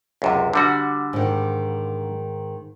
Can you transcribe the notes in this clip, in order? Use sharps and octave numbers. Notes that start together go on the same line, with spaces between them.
C#2 F#2 C3
D3 G3 F#4
G#2 D#3